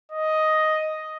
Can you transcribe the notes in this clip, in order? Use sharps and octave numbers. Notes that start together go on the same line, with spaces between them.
D#5